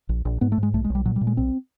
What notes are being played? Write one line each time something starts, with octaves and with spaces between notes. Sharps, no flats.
A#1
A#1
G#2 B3
A3
G#2
G#3
B1 A3
G#3
B1
G3
A#2 F#3
G3
A#2
G#3
B1 C4